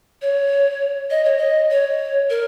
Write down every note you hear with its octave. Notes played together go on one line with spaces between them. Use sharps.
C#5
D#5
C#5
D#5
C#5
A#4